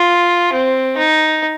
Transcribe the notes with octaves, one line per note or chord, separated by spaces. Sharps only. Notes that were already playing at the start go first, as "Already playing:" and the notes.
Already playing: F4
C4
D#4